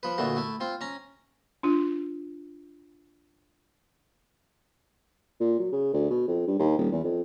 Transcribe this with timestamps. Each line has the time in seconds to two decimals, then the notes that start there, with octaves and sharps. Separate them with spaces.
0.03 F3 B4
0.18 D2 A#2 E3 A3 F#4
0.36 A3 E4
0.60 C4 F4
0.81 C#4 A#5
1.63 D4 F4
5.40 A#2
5.59 F#3
5.72 C#3
5.93 D2
6.10 B2
6.27 F2
6.47 G2
6.59 D#2
6.78 D#1
6.92 E2
7.03 F2